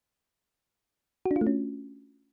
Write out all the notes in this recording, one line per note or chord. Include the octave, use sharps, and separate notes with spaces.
F#4
D4
F4
A3
C#4